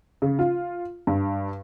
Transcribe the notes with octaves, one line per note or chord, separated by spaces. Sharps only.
C#3
F4
G2